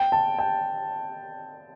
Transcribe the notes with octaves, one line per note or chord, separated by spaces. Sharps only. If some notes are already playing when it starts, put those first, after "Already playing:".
Already playing: G5
A5
G5